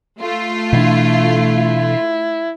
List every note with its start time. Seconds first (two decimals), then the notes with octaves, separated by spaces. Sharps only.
0.20 A3 F4
0.73 B2 E3 D4 E4